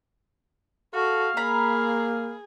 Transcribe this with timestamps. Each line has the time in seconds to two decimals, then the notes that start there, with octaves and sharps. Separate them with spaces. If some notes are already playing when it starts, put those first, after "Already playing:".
0.94 F#4 A4 F5
1.37 A#3 G#4 A#5 B5